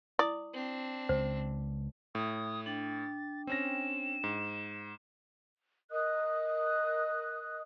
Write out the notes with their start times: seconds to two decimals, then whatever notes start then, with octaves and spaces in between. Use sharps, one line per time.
0.19 E4 D5 D#6
0.53 C4 D4
1.09 C#2 C5
2.15 A2 D#6
2.66 D4 G5 A6
3.47 C4 C#4 A#6 E7
4.24 G#2
5.91 A#4 D#5 D#6 F#6